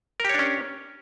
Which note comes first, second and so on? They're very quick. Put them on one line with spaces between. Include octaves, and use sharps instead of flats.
A#4 G4 C#5 D4 C#4